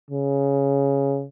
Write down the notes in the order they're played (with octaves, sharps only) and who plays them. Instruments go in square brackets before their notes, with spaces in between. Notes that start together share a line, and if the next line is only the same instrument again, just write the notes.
[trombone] C#3